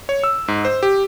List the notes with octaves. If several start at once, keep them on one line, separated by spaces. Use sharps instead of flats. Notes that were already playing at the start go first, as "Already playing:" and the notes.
C#5
E6
G#2
C5
G4